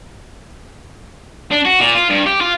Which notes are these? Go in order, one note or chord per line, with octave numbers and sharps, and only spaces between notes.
D4
F#4
A#2
F4
G2
G4
F4